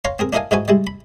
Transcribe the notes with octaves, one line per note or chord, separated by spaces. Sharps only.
C#5 F5 A#5 C6
C4 G#4 A#4
D4 E4 A#4 D#5 F5 G#5
G#2 D#4 E4 F#4 B4 G#5
G3 G#3 E4
B5